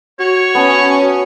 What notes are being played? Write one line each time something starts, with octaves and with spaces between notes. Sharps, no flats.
F#4 C#5
B3 C#4 A5